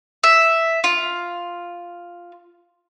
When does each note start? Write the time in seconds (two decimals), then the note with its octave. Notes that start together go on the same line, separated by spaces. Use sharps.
0.23 E5
0.84 F4